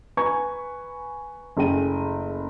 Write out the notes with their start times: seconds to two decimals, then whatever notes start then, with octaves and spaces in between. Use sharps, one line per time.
0.17 B4 G#5 A#5 C#6 G#6
1.57 F#1 A3 G#4 G5 D#7